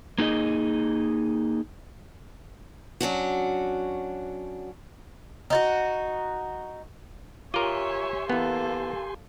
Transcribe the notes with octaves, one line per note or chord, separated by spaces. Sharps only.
A#3 D#4 G#4 D#5
F#3 C#4 D4 F#4
D#4 F4 F#4
F4 G4 A#4 C#5 E5 G#5 C6
E3 A#3 B3 A4